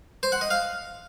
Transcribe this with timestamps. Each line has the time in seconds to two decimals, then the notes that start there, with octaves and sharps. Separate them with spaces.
0.23 C5
0.32 F#5
0.41 D#5
0.50 F5